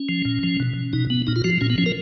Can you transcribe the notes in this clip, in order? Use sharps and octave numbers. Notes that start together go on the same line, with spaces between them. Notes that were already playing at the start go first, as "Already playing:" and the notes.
Already playing: C#4
F3
A#2
F3
B2
B2 D#4
B3
A#2 D#4
F4
F3 F#4
A#2 C#4
B3
F3 C#4
A#4